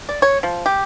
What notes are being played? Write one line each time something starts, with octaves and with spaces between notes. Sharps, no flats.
D5
C#5
F3
G4